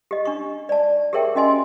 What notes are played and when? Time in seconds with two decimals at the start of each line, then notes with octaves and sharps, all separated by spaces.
0.11 G4 D#5
0.25 D4 C#6
0.69 D5 A5
1.13 G4 G#4 A#4 C#5 E5 G5
1.35 C#4 F#4 D#5 G#5 C6